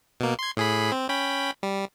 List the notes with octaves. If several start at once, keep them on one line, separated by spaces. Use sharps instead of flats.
B2 A#3
C6 G#6
A2 G#4 B5
C4
C#4 G5 B5
G3